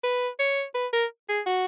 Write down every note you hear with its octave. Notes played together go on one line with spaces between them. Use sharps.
B4
C#5
B4
A#4
G#4
F#4